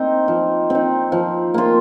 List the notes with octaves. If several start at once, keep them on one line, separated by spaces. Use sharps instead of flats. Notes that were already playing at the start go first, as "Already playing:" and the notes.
Already playing: C4 D#4
F3
C4 D#4
F3
A#3 F4